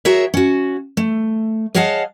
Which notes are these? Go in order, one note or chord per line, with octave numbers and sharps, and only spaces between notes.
F#4 G#4 A#4 C#5 E5
C#4 F#4
A3
G#4 C#5 D#5 F5 F#5 A5